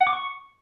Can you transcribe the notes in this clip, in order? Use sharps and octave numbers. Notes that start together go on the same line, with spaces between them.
F#5
D6
C#6